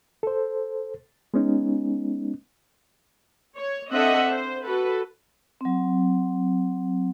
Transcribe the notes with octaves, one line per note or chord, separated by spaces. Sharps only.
A4 C5
G#3 B3 C#4 D#4
C#5
C4 D4 A4 D#5 E5 F#5
C5
F#4 A4 B4
F#3 C4